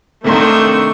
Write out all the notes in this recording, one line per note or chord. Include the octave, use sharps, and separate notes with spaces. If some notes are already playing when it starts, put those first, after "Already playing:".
C3 D#3 A3 A#3 D4 D#4 C6 C#6